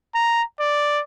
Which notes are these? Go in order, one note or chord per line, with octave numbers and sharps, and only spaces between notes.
A#5
D5